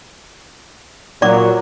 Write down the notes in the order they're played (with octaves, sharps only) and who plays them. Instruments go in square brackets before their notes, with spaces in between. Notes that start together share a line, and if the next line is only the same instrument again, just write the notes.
[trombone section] A#2 F#3 [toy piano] D5 D6